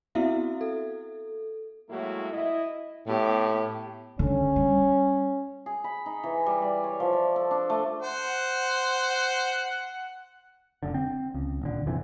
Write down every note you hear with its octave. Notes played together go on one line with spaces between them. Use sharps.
B3 C4 E4 F#4 E5 F5
A4
A2 F#3 G#3 A#3 E4 F#4
E4 D#5
A2 B3 G4
D3 C#4
G3
G#4
B5
D#4
E3
G3
D5
C#5
F3
D5
A4
D4
A3
C5 F#5
F1 D3
C4
C#2
D#1 D3
A#1 F2 C3 E3